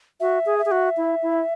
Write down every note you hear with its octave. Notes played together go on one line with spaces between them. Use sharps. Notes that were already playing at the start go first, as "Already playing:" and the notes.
F#4 E5
G#4
E5
G#4
F#4
E4
E4